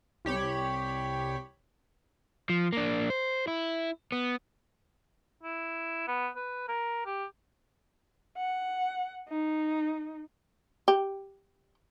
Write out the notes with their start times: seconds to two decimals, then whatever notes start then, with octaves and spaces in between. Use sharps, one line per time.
0.25 C2 G4 C#5 B5
2.50 F3
2.72 A#3 D4
3.10 C5
3.48 E4
4.12 B3
5.44 E4
6.08 B3
6.36 B4
6.68 A#4
7.06 G4
8.37 F#5
9.29 D#4
10.88 G4